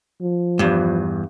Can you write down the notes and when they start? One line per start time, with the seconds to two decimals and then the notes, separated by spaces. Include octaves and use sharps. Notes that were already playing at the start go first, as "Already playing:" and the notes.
0.21 F3
0.59 E2 G2